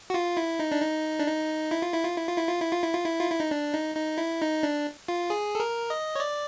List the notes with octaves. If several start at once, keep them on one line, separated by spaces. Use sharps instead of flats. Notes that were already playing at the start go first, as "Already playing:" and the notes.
F#4
F4
E4
D#4
D4
D#4
D4
D#4
E4
F4
E4
F4
E4
F4
E4
F4
E4
F4
E4
F4
E4
F4
E4
D#4
D4
D#4
D#4
E4
D#4
D4
F4
G#4
A4
A#4
D#5
C#5
D5